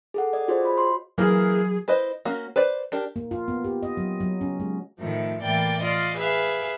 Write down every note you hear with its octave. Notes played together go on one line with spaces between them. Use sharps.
G#4 A4 F#5
D5 D#5
F4 F#4 G#4 C5 C#5 D#5
B5
C6
E3 F#3 A#3 G#4 A#4
E4 B4 C5 D#5
A#3 C#4 F#4
B4 C5 D5
D4 G4 A#4
A#3
F4
B3
G4
D#5
F#3
F#3
C#4
G#3
A2 D#3 F3 A3
A2 E3 A#3 D5 G5 A6
F4 D5 D#5 F5
G#4 B4 E5 F5